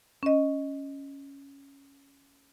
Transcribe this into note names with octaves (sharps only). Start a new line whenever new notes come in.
C#4 D#5